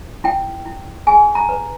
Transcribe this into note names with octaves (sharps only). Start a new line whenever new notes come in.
E4 G5
E4
G#4 G#5
A#5
B4